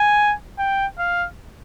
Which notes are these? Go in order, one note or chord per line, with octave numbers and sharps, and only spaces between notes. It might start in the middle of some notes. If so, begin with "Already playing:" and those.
Already playing: G#5
G5
F5